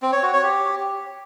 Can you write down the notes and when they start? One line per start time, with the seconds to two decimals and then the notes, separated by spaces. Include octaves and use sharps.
0.02 C4
0.12 C#5
0.23 F#4
0.33 C#5
0.43 G4